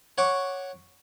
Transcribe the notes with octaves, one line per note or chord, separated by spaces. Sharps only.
C#5 F#5 C#6 D6